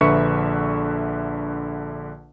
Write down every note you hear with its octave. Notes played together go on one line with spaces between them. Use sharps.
A#1 D3 B4 E5 C#6 C#7